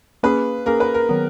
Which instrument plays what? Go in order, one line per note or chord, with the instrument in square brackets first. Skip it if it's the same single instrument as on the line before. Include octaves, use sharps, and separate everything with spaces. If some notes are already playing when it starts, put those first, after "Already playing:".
[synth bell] A#3 C#4 G#4 [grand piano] B4
[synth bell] A#3 C#4 G#4 [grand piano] A#4
[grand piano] B4
A#4
[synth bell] D#3 F#3 B3